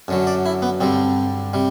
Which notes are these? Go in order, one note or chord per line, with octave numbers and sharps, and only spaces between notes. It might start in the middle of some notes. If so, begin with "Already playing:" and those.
F#2 D3 F#3
D5
E4
B3
G2 D3 G3 C4
C3 G3